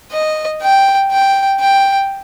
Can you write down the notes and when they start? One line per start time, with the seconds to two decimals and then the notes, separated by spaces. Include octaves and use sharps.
0.12 D#5
0.62 G5
1.11 G5
1.60 G5